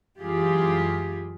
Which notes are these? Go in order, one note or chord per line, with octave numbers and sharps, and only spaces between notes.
F#2 E3 G#3 F4 G4 G#4